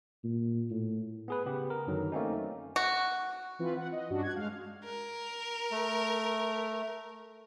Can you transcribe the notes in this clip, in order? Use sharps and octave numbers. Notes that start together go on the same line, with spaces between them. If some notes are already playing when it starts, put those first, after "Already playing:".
A#2
A2
B3 G#4 B4
C#3 B3 G4
A#4
F#2 D3 D#3 F#3
A3 A#3 C4 C#4 D#4
F#4
E3 C4 F4 B4
F#5
D#5
G2 C#4 D4 F#4
F#6 G#6
G#3 F5
A#4
A3